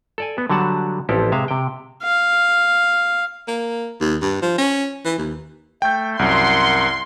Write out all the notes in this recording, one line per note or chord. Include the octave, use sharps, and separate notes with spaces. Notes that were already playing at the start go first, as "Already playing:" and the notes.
A4 D5 G#5
B3
D3 F#3 G3 F#5 A5
A1 F3 C4 E4 G4 A4
C3 G#3 E5 F5
C3 G5
F5
A#3
D#2
G2
F3
C#4
E3
D#2
A3 G5 G6
C2 F#2 A#4 F#5 C6 C#6